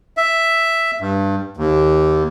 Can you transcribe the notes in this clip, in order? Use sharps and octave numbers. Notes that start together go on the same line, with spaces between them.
E5
G2
D#2